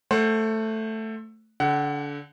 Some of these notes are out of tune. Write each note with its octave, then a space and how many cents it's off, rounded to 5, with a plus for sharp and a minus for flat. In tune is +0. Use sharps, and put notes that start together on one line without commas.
A3 +5 C5 +25 F#5 +0
D3 -30 F#5 +25